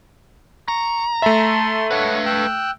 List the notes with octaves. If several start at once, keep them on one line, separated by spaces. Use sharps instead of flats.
A#5 C#6
A3 E5 A5 C6
B4 C#5 F5 F#5
G5 E6 F#6